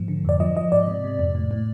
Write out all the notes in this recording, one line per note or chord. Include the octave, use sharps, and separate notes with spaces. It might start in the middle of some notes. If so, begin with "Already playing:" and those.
Already playing: G#2 F3
D3
F2 D5
F3 D#5
F3 D#5
G#2 D5
C3
C3
F2
A2
A2